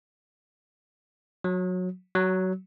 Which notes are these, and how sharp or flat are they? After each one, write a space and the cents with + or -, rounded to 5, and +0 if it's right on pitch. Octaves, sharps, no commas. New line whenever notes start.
F#3 -20
F#3 +15